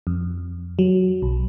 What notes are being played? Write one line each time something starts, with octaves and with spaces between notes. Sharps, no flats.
F2
F#3
B1